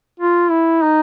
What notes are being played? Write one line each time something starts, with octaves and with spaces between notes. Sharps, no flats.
F4
E4
D#4